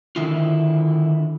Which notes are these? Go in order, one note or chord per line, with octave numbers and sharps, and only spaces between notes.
D3 D#3 E4 F4